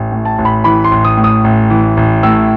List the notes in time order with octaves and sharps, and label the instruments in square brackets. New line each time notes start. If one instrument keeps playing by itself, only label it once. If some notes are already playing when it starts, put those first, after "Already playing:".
Already playing: [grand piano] A1
A2
A5
A1
B5
E3 B5
C6
A1
D#6
A2
D#6
A1
E3
A1
A2 E6